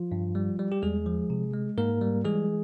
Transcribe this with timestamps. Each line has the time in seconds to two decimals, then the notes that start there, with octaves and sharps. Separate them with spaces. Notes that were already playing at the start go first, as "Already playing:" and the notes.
Already playing: F3 F4
0.12 G2
0.35 G3
0.59 G3
0.72 G4
0.82 E2 G#3 G#4
1.06 F3
1.30 C3
1.53 G#3
1.78 G#2 A#3 A#4
2.01 G3
2.25 E3 G#3 G#4